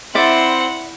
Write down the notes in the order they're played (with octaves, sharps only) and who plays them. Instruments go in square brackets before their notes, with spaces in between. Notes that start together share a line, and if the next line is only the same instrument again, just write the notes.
[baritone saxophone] C4 [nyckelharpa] E4 C6 [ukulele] D5 E5 [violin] F#5